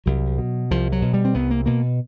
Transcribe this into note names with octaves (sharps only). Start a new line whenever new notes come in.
C2 F#3
B2
C2 F3
F#3
B2
G3
C4
C2 B3
A#3
B2 A#3